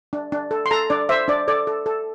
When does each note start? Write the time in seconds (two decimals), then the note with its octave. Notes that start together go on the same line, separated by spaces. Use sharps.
0.13 D4
0.32 D4
0.51 A4
0.66 C6
0.71 A4 A#5
0.90 D4 D5
1.09 C5 E5
1.28 D4 D5
1.48 A4 D5
1.67 A4
1.86 A4